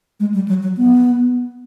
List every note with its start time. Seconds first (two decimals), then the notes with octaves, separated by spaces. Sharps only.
0.20 G#3
0.34 G3
0.48 F#3
0.63 F#3
0.77 B3